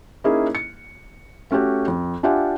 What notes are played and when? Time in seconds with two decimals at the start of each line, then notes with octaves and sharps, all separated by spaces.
0.24 A#3 C#4 D#4 E4 G#4
0.55 C#7
1.51 A3 C#4 F#4 G4 A4
1.88 F2
2.23 D4 F4 G4 E5 F#5 G#5